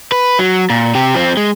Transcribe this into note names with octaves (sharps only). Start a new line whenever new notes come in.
B4
F#3
A#2
C3 G4
F3 C4
G#3